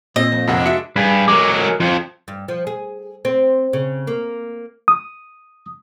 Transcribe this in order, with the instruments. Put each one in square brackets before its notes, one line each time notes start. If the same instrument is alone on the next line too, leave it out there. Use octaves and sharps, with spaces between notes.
[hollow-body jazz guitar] A#2 [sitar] C4 [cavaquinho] D#5
[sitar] F2
[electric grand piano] F2 C3 F#5 [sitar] G#3 A#3 D4
[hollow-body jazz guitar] F#4 E5 [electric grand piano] E6 C#7
[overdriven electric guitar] G2 [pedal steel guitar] G#4 B4
[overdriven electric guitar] F#3 G#3 [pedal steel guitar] A#4 D6
[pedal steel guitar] A#4
[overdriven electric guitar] F2 [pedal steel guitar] F4
[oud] G2
F3
G#4
C4
C#3
A#3
[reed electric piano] D#6